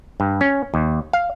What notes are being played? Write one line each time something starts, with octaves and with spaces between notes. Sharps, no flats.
G2
C#4
D#2
F5